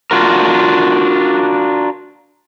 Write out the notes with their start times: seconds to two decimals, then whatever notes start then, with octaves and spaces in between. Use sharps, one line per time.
0.11 D4 F4 F#4 A#4